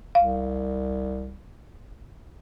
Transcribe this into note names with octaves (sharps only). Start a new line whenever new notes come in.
C2 F5